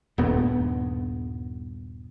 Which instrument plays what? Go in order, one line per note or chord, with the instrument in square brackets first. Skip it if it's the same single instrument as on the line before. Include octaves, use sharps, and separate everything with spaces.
[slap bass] D#1 G2 B3